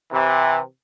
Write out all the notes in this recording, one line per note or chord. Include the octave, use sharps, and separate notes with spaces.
C3 E3